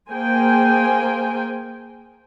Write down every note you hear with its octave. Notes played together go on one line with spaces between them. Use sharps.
A#3 G#4 C5 G5 G#5